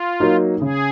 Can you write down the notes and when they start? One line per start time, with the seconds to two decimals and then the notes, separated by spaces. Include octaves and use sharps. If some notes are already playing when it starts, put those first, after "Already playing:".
Already playing: F4
0.20 F#3 A#3 D#4
0.61 C#3 G#4